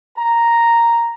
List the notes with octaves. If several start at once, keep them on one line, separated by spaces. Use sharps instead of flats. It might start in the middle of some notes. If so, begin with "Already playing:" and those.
A#5